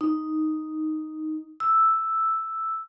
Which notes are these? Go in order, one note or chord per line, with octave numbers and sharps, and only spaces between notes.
D#4
E6